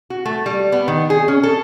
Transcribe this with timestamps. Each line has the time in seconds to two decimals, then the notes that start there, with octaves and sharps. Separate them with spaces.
0.10 F#4
0.26 A3
0.46 G3
0.72 B3
0.88 D#3
1.10 G#4
1.28 C#4
1.43 A4